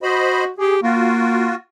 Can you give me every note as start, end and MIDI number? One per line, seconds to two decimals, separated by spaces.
0.03 0.49 66
0.03 0.44 72
0.03 0.44 75
0.03 0.44 83
0.58 0.80 67
0.58 0.76 68
0.83 1.52 58
0.83 1.55 65
0.83 1.55 66